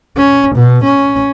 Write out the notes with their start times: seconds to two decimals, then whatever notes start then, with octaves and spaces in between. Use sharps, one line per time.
0.17 C#4
0.56 B2
0.84 C#4